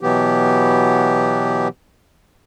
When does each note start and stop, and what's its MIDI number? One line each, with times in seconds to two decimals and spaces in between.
0.01 1.68 47
0.01 1.68 52
0.01 1.68 54
0.01 1.68 59
0.01 1.68 67